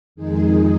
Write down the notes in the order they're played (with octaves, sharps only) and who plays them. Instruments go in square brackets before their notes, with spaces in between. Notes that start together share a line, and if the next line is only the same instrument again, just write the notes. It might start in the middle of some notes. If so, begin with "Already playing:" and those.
[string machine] F2 D#3 G#3 D#4 G#4